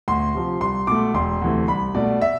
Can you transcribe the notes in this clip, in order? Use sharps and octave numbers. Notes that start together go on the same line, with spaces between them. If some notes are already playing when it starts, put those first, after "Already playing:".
D2 C6
C3 F3
C2 C6
B2 A3 D6
E1 C6
D2 C3 E3 A3
C2 B5
B2 A3 D5
E5